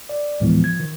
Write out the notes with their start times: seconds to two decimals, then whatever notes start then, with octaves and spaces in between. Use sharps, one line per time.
0.09 D5
0.40 D2 A2 E3 F3 G#3 B3
0.63 F3 G#6
0.80 D#3